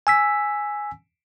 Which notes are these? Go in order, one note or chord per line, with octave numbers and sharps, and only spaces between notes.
G#5 E6 B6